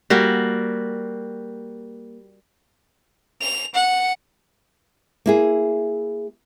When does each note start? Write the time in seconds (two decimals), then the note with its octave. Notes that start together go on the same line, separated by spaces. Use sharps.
0.10 G3 A#3 F#4
3.41 F7
3.75 F#5
5.26 A#3 E4 G#4